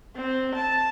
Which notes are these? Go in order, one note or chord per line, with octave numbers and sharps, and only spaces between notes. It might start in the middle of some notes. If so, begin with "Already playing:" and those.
C4
A5